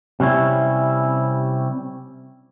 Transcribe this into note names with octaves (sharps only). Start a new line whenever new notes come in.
C3 G3 C#4 E4